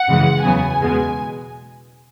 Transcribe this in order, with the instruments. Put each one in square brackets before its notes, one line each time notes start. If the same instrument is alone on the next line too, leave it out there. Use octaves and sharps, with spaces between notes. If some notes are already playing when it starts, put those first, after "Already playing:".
Already playing: [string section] F#5
F#2 C#3 E3 G#3
E2 C#3 F#3 B3 G#5
E2 B2 G#3 B3